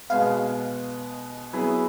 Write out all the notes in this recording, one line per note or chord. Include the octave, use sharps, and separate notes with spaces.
B2 G#3 B3 F5
F#3 B3 E4 G#4 B4